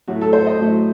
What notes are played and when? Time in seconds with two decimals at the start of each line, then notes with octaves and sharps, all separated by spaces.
0.08 A2 F#3 A3 F#4
0.21 A4
0.33 C5
0.47 D#5
0.59 A2 F#3 A3